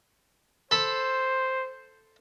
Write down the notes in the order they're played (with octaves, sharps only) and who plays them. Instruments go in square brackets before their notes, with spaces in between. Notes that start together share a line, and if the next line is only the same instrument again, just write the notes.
[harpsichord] A4 B5 [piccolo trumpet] C5